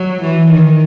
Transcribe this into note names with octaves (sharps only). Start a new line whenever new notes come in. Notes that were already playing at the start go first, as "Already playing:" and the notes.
Already playing: F#3
E3
D#3